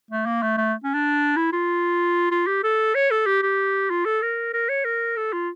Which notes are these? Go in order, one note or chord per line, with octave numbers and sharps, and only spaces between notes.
A3
A#3
A3
A3
C#4
D4
E4
F4
F4
G4
A4
C#5
A4
G4
G4
F4
A4
A#4
A#4
C#5
A#4
A4
F4